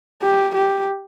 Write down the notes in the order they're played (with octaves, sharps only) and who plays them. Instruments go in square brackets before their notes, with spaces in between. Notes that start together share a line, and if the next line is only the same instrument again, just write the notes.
[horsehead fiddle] G4
G4